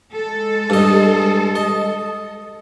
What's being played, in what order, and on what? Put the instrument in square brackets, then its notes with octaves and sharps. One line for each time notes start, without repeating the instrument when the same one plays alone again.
[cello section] G#3 A4
[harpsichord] G2 D#5
D#5